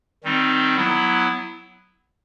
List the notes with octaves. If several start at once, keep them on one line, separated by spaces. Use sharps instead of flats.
D#3 G3 C4 D#4
F#3 B3 E4